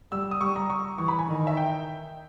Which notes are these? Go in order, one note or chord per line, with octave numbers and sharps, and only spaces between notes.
G3 E6
D#6
G3 C#6
A#5
C#6
E3 C#6
B5
G#5
D#3
E5
G5